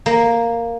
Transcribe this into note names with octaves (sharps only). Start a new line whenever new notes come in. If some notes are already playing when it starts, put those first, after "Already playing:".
A#3